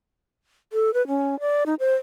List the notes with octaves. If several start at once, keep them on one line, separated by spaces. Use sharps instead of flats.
A4
B4
C#4
D5
D#4
C5